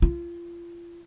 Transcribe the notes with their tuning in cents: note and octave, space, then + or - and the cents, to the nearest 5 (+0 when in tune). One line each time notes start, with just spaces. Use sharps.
F4 -30